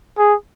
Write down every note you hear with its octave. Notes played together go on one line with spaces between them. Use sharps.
G#4